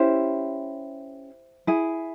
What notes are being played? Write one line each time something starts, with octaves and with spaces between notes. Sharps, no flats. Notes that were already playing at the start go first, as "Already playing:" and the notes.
Already playing: C#4 E4 G4 C5 E5
E4 G#4